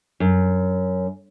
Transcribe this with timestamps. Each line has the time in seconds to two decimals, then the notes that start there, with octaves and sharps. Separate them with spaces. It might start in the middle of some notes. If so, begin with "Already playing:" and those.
0.20 F#2